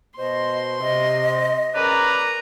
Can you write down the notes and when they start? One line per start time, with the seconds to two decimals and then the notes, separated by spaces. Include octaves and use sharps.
0.19 B2 F#4 C5 D#5 C6
0.81 C3 D#5
1.75 C#4 G#4 A#4 B4 D5 A#5